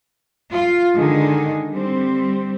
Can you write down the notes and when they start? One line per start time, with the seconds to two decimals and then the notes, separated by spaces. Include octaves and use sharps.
0.52 F4
0.95 D3 D#3 G#3 D#4 G#4
1.70 G3 C4